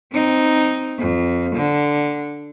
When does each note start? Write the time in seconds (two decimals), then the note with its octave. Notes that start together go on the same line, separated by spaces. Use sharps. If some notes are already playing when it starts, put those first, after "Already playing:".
0.12 C4 D#4
0.99 F2
1.55 D3